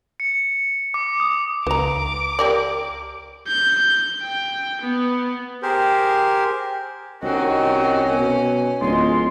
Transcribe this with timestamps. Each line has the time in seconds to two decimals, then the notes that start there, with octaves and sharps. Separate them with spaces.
0.20 C#7
0.94 D6
1.20 D#6
1.67 C#2 B4 A#5 D6
2.39 G4 A#4 D5
3.47 G6
4.22 G5
4.82 B3
5.62 G4 G#4 A#4 C5
7.22 C2 D#3 C4 C#4 F#4 G#5
8.13 B2
8.81 D1 G#3 F4 C6